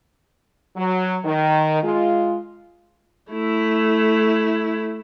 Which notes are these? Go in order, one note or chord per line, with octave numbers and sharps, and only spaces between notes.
F#3
D#3
G#3 F4
A3 E4